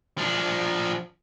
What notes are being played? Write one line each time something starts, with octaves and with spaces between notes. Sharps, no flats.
F3 D4